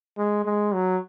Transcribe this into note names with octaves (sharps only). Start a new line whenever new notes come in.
G#3
G#3
F#3